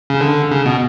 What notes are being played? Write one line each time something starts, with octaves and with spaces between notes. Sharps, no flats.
C#3
D3
C#3
B2